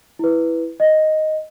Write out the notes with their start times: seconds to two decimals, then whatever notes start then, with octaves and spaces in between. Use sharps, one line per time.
0.19 E4 B4
0.80 D#5